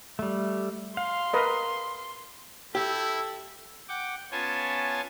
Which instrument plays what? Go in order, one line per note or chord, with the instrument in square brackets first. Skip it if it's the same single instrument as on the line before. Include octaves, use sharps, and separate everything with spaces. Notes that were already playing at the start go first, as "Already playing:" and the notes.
[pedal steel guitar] G3 A3
[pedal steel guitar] F5 [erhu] C6
[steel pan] A#4 B4 D#5
[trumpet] E4 [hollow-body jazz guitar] G4 [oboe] A4
[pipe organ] F#5 G5 D6
B3 C#4 F4 C#5 G#5 A5